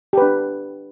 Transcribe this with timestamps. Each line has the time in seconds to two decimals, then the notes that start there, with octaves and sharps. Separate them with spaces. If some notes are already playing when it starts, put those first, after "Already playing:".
0.13 G4
0.18 B4
0.22 D4